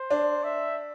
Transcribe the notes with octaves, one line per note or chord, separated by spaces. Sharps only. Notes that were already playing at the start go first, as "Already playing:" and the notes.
Already playing: C5
D4
E5